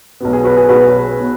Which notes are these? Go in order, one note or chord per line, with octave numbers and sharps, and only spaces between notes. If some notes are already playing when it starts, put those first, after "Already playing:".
B1 B2 B3
G#4
F#4 B4
G#4
B1 B2 B3 F#4 B4
G#4 C#5
B2 B3